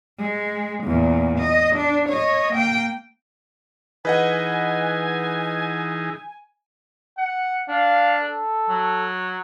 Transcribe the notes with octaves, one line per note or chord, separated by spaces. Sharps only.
G#3
E2 A#2
D#5
D4
C#5 D#5
A#3 G5
E3 D#4 G#4 B4 D#5 F#5 G#5
F#5
D4 F5
A4
F#3